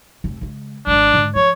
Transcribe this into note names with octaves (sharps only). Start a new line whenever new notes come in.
F1 C4
C#3 G#3
G#1 D#3 D4
G#2 D3
F3 C#5